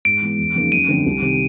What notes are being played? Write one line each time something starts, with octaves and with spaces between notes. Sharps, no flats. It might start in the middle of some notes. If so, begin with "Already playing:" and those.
G#2 D7
E3 G#3 B3
E2
C#3 F3 A#3 D#4
F#2 D#7
D3 F3 A3 C4
C2
C3 D#3